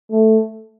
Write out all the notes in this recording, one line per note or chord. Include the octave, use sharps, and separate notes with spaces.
A3